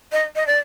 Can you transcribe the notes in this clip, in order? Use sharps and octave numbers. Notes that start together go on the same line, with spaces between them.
D#5
D#5
D5